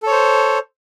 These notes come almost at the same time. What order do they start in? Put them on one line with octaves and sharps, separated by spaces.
A4 C#5 C5